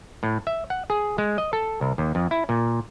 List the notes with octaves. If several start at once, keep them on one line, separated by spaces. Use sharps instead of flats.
A2
E5
F#5
G#4
G#3
D#5
A4
C2
D#2
F2
E4
A#2